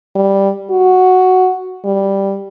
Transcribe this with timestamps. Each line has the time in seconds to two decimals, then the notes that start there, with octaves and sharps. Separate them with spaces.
0.16 G3
0.70 F#4
1.85 G3